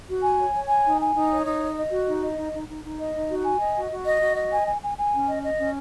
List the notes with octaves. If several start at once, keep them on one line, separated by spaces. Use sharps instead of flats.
F#4
G#5
C#5
C#5
G#5
D#4
G#5
D#4
C#5
D#4
D#5
D#5
F#4
D#4
D#5
D#4
D#4
D#4
D#4
D#5
D#4
F#4
G#5
D#5
F#4
F#4
D#5
F#4
D#5
G#5
G#5
G#5
G#5
C#4
D#5
D#5
C#4